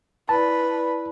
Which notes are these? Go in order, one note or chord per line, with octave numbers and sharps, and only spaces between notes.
E4 B4 D5 A5